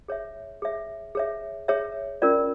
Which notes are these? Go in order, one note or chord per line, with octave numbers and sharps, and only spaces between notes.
G#4 C#5 E5
G#4 C#5 E5
G#4 C#5 E5
G#4 C#5 E5
C#4 F4 A#4 D5